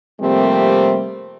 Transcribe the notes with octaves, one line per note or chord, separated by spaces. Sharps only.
C3 F3 G3 A3 A#3 C4